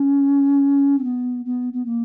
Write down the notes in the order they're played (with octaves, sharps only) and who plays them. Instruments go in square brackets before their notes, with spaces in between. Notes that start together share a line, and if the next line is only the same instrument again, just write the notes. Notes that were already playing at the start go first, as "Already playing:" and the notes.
Already playing: [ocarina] C#4
C4
B3
B3
B3
A#3